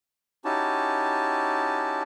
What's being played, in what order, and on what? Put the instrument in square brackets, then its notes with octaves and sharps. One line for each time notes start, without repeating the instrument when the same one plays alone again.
[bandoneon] C#4 D#4 E4 F#4 G4 A5